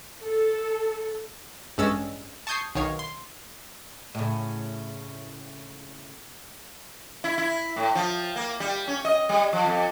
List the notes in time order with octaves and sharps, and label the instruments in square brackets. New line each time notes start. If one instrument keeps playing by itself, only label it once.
[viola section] A4
[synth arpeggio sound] A1 G2 G#3 C#4 E6 A6
A5 C#6 D#6 G6 G#6 C7
B1 D#3 C#5 F5 G#6
C6
[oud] A2 C#3
[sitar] E4
E4
A2
F3
A#3
G3
C#4
D#5
G3
F3
F2